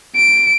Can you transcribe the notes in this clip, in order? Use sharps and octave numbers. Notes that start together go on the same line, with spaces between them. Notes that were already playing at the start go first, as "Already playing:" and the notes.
D7